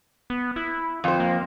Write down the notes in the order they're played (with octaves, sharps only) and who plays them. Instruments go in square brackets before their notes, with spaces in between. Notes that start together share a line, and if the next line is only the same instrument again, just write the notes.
[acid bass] B3
E4
[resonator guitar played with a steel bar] F2 C5
[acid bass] A#3